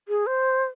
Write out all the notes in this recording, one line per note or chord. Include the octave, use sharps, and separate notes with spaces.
G#4
C5